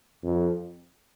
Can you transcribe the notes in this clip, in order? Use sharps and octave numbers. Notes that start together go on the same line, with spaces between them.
F2